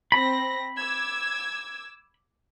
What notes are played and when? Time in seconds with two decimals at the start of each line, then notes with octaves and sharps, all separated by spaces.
0.12 C4 B5 A#6
0.75 D6 E6 G#6